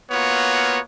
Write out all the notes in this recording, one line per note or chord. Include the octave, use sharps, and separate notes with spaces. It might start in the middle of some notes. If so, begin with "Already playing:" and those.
A#3 B3 F4 F#4 C#5